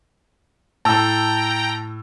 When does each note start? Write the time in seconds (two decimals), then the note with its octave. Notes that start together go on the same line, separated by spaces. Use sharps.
0.85 A2 G5 A5 A#5 E6